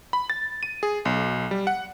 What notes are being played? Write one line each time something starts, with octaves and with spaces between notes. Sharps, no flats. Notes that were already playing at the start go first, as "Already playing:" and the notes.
B5
A6
D#7
G#4
B1
G3
F#5